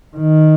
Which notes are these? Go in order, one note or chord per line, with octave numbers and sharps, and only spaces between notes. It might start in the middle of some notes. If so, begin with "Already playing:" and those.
D#3